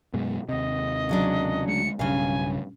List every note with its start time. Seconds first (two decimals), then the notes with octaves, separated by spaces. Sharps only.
0.13 F#2 B2 G#3
0.49 D#2 C3 D#5
1.09 C#3 F#3 D4
1.68 D2 G#3 C#7
1.99 B1 G2 C#3 F5 G#5